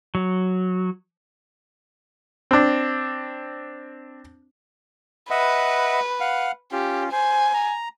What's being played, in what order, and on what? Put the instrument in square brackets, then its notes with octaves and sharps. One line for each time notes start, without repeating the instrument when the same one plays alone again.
[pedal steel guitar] F#3
[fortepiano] C4 D4
[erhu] B4 [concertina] D#5 E5 F#5
[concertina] F5 F#5
[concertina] C#4 F4 [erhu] G4
[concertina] C5 [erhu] G#5
[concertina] A#5